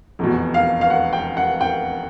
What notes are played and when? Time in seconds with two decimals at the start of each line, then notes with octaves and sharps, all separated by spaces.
0.19 F1 E2 B2
0.54 F5
0.81 F5
0.90 F#5
1.13 G5
1.37 F#5
1.61 G5